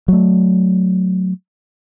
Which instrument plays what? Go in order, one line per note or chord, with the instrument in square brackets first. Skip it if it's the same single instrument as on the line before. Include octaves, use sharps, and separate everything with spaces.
[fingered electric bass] F#3 A3